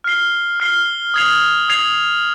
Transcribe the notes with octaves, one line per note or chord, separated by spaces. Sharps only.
F6 C7 G7
F6 C7 G7
D#6 G#6 C7 F7
D#6 G#6 C7 F7